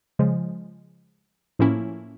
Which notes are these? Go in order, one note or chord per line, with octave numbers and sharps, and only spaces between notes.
C#3 F3 G#3
A2 F3 A#3 C#4 E4